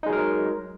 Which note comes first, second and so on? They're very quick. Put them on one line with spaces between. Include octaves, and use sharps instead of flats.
D#4 G#3 F#3 A#4